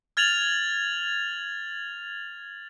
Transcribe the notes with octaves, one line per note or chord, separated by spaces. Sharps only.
F6 G#6 A6 F7 F#7